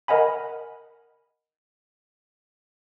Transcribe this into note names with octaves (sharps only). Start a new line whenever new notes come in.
A#4 D#5 F#5 G#5 B5